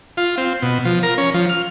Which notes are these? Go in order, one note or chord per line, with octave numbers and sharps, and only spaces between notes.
F4
C4
B2
F3
A#4
C#4
F3
F6